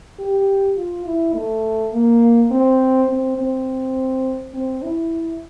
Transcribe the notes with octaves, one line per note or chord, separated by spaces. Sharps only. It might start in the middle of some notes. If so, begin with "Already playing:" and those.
G4
F4
E4
A3
A#3
C4
C4
C4
C4
E4